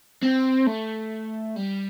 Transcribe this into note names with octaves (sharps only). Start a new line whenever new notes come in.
C4
A3
G3